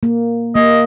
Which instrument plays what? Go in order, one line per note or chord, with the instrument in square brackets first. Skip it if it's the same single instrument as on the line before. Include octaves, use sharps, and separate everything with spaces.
[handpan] A#3
[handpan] A#3 [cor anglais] D#5